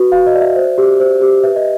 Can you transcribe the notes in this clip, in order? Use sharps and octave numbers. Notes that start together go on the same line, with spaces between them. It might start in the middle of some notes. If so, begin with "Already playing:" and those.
Already playing: F#4 B4
F#4 F5
D#5
D5
E5
C5
G4
C5
G4
B4 E5
D#5